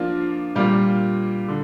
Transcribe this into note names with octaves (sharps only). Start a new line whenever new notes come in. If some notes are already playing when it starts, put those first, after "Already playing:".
Already playing: F3 A#3 D4 F4
A#2 G3 A#3 F4
D3